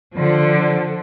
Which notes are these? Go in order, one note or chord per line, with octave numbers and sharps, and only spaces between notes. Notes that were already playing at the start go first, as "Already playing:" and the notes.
D3 F3